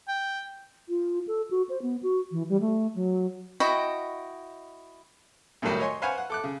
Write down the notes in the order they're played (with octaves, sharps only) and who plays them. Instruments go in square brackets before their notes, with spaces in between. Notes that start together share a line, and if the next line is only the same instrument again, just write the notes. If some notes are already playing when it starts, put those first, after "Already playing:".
[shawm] G5
[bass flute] F4
A4
F#4
C5
B3
F#4
E3
G3
A3
F#3
[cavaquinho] E4 F#4 D#5 G5
[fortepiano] B1 A2 D#3 F#3 G3
C#5 D#5 G#5 C6 C#6
B4 C5 F5 F#5 G#5 C#6
F#5
A4 D6 F#6
C#3